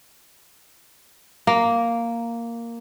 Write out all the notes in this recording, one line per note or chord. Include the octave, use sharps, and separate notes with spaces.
A#3